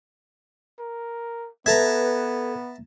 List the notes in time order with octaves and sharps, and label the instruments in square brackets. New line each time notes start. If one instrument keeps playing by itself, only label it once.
[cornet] A#4
[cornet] B3 [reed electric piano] A4 G#6 [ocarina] B4 [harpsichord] E5 A5 A#5